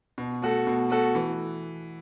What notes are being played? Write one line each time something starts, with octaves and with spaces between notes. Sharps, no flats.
B2
A3 F#4 A4
B2
A3 F#4 A4
E3